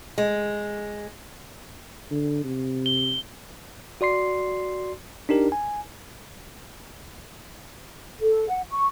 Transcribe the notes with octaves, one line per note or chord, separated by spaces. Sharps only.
G#3
D3
C3
G7
F#4 D5 C6 C7
D4 D#4 G4 A#4
G#5
A4
F#5
C#6